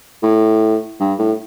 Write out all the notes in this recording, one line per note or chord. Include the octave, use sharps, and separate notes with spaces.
A2
G2
A2